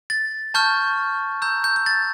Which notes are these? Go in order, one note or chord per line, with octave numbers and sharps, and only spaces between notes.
A6
A5 C#6 F6 G6
A#5 E6 G6
G6
G6
A6